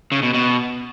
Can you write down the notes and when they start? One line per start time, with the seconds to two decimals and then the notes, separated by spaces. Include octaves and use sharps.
0.12 C#3
0.23 B2
0.34 B2